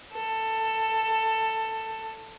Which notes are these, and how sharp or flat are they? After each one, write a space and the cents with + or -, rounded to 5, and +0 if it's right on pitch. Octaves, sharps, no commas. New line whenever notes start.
A4 +15